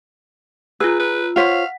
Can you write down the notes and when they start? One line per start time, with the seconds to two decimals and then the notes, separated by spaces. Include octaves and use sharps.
0.80 F4 G#4 B4 E6
0.99 B4
1.36 F4 C5 C#5 F5 F#5 B6